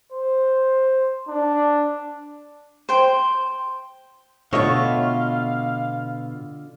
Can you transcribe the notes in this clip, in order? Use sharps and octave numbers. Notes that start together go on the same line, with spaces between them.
C5
D4
C5 G5
B2 D3 A3 F4 C#5 D#5 F5